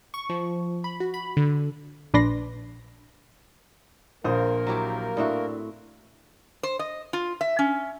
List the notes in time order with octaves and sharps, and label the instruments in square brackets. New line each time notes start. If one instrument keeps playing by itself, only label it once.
[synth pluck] C#6
F3
B5
F#4
B5
D3
A#1 D4 B4 D5 C6 A#6
[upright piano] A#1 C5 D#6 [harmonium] A#3 A#4
[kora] F#3 E4 G4
[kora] A2 C4 F#4 [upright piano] D4 E5
[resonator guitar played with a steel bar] C5
D#5
F4
E5
C#4